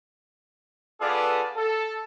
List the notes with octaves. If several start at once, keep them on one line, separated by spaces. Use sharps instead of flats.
B3 F4 G#4 A4 B4 D5
A4